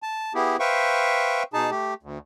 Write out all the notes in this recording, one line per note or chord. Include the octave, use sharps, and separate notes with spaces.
A5
B3 E4 G4 G#4
B4 C5 E5 F5 G5 C#6
B2 D#4 G#4 A5
A3 G4
D2